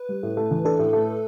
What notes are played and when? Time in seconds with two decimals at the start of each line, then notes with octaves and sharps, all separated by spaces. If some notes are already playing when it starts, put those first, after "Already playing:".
Already playing: B4
0.09 G3
0.23 A2
0.37 A3
0.51 E3
0.65 D4 A4
0.79 A2
0.93 A3